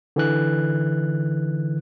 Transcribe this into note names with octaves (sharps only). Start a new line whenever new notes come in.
D3 E3 F#6